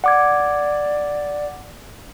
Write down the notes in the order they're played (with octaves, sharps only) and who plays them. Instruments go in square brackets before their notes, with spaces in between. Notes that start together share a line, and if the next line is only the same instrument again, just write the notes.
[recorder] D5 [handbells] F#5 D6 G#6